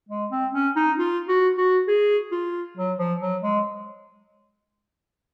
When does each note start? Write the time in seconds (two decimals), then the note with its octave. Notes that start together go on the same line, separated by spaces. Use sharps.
0.09 G#3
0.31 C4
0.53 C#4
0.76 D#4
0.99 F4
1.28 F#4
1.58 F#4
1.88 G#4
2.32 F4
2.77 F#3
2.98 F3
3.21 F#3
3.43 G#3